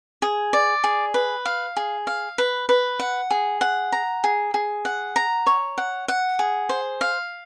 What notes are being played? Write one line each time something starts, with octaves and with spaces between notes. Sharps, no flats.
G#4
D5
G#4
B4
F5
G#4
F5
B4
B4
F#5
G#4
F#5
A#5
G#4
G#4
F#5
A#5
C#5
F#5
F#5
G#4
C5
F5